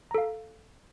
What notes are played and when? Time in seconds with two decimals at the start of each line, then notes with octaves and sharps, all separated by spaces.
0.11 A#5
0.14 A4
0.18 F5